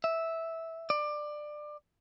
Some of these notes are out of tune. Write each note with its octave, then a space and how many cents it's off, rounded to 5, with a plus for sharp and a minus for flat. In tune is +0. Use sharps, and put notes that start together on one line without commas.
E5 -10
D5 +20